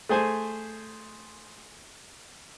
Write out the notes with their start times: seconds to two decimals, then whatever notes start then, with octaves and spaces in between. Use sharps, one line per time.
0.09 A3 G#4 C5 G#5